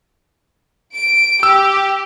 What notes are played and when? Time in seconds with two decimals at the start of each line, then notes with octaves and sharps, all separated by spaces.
0.94 D7
1.43 G4 E6